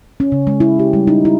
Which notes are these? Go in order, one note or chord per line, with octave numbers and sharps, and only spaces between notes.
C#4
C#3
G#3
E4
G4
G3
D#4
E4